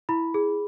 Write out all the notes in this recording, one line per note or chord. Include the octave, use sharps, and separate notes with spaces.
E4 B5
G#4